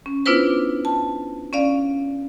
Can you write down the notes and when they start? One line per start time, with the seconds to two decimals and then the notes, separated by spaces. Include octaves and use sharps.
0.06 C#4
0.26 B3 D4 E4 F4 B4 C5
0.85 A5
1.53 C#4 D5 F5